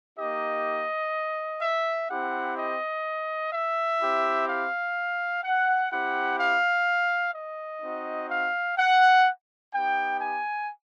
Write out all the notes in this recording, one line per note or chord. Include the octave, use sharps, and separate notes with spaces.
A#3 D#4 G4 D#5
E5
C4 E4 G4 F#5
D#5
E5
C4 E4 G4
F5
F#5
C4 E4 G4 F#5
F5
D#5
C4 D#4 F#4
F5
F#5
B3 D#4 G4 G5
G#5